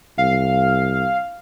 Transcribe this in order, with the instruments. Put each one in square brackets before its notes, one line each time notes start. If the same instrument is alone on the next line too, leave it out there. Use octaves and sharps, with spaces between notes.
[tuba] C2 [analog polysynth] F5